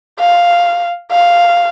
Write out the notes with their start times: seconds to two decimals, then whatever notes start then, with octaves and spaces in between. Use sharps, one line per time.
0.19 F5
1.11 F5